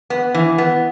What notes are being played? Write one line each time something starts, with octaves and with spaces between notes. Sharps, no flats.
B3
E3
B3